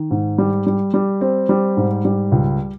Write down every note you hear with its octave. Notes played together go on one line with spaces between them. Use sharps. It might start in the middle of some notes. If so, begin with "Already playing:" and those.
Already playing: D#3
G#2
G3
G3
G3
C4
G3
G#2
G3
C#2